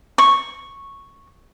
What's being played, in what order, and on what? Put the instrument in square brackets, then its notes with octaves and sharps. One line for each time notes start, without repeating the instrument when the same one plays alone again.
[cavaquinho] C#6